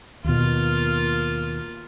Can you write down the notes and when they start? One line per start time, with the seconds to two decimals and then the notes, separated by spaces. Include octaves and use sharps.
0.24 D#2 B2 A#3 F4